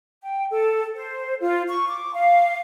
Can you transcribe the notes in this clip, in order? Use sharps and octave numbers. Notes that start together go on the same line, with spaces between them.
G5
A4
C5
F4
C#6
D6
F5